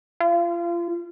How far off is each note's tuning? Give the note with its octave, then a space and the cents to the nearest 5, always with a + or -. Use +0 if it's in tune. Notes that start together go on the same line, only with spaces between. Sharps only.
F4 -30